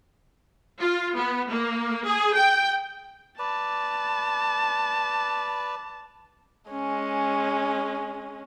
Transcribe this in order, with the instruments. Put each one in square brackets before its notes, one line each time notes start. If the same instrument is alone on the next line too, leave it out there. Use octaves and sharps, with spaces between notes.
[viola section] F4
B3
A#3
G#4
G5
[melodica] B4 D5 [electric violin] A5
[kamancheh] G#3 C#4